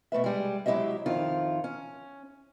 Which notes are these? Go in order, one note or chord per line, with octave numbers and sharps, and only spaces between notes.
B2 A3 B4 E5
G3 G#3
F#3 G#3 E4 G4 D#5 E5
F2 D#3 E4 F4
C#4